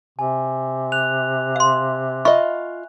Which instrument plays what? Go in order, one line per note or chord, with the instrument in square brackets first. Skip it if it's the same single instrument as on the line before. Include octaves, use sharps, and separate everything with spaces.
[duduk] C3 [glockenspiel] G#5
[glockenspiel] F#6 F7
[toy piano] F5 C6
[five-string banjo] F4 D#5 [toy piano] E5 B5 C#6